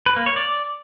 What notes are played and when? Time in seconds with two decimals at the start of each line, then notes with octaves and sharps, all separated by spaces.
0.06 B4
0.16 A#3
0.26 C#5
0.36 D5